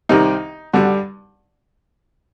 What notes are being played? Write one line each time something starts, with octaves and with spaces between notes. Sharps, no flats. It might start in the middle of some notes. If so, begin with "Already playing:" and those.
C2 C3 D#3 D#4
G2 D3 G3 F#4